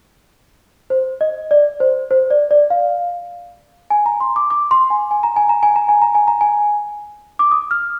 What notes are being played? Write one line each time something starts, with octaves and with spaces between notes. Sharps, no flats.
C5
D#5
D5
C5
C5
D5
D5
F5
G#5
A#5
C6
D6
D6
C6
G#5
G#5
A#5
G#5
A#5
G#5
A#5
G#5
A#5
G#5
A#5
G#5
D6
D#6
F6